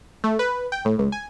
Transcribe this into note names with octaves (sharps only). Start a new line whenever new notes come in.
A3
B4
G5
A2
C#2
G#5